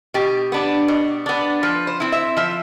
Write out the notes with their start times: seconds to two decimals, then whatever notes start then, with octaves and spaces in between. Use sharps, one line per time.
0.14 B2 G4
0.52 B3 D4
0.88 B2
1.26 B3 D4
1.63 F3 B4
1.87 C5
2.00 C4 E4
2.12 E5
2.37 F3 E5